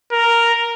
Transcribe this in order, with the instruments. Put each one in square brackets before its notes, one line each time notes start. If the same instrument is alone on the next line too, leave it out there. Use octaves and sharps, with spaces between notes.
[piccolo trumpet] A#4